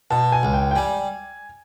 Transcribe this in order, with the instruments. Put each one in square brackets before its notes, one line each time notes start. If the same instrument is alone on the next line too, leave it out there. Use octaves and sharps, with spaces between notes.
[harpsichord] B2 [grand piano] A5
[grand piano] G#5
[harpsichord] C#2
[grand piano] G5
G5
[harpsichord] G3 [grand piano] G#5